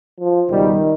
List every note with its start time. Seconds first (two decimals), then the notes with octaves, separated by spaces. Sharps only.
0.20 F3
0.50 C#2 B2 D#3 G3